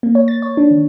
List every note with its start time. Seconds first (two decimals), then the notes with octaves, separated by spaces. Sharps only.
0.03 A#3
0.15 C#5
0.28 A6
0.42 C#5
0.57 D4
0.71 D#3